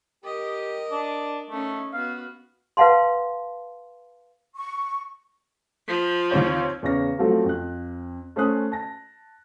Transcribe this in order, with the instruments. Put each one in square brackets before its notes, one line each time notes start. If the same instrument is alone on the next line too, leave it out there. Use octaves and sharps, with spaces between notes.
[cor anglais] G4 [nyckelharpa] A#4 D#5
[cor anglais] D4
[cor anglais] A3 [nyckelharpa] C#4 D#4
[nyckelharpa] B3 F#4 [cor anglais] F5
[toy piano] B4 F5 F#5 A5 C6
[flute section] C#6
[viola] F3
[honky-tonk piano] D#2 C4 C#5
[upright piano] E2 C#3 C#5 C#6 F6 A#6
F3 F#3 A3 C4 F#4 A4
F2 F#6
A3 C#4 C5 G#5 D#6 F#6
A5 A#6